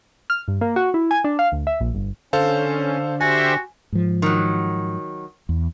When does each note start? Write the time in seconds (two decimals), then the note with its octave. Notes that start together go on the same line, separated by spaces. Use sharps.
0.30 F6
0.48 G2
0.61 A#3
0.76 F#4
0.94 E4
1.11 G#5
1.24 D4
1.39 F5
1.52 D2
1.67 E5
1.80 A#1
1.94 G1
2.33 D3 C#4 A4 C5 F5
3.21 F#4 G4 C5 E5 G#5
3.92 G#2 F3
4.22 D#3 F#3
5.49 E2